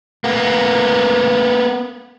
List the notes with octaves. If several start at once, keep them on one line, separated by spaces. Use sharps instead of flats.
A#3 B3